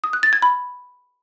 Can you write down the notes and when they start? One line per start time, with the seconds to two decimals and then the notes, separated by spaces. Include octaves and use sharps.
0.04 D#6
0.13 F#6
0.23 A6
0.33 G#6
0.42 B5